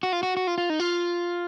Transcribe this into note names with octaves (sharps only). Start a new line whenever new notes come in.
F#4
F4
F#4
F#4
F4
F4
D#4
F4